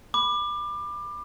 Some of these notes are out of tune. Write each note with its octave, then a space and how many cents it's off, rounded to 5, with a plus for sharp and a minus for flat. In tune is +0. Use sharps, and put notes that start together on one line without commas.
B5 +0 D6 +25